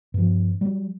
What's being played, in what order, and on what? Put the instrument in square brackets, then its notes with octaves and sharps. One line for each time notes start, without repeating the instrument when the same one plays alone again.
[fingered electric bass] G2 F3
F#3 G3